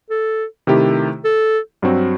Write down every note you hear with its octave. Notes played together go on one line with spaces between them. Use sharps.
A4
C3 D#3 A3 E4 G4
A4
G2 F#3 C4 F#4